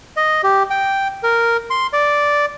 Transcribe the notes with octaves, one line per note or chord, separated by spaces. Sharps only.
D#5
G4
G5
A#4
C6
D5